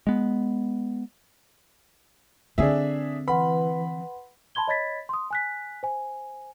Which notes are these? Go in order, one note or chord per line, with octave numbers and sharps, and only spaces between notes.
G#3 B3
D3 C4 D4 G#4 E5
E3 B4 F#5 B5 C6
A5 B5 C6 G#6 G7
C#5 D#5 B5 G#6 A6 B6
C6 D#6
G#5 F#6 B6
C5 G#5